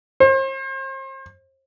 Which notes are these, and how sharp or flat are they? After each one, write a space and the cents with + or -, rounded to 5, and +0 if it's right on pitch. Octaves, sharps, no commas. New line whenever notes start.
C5 +40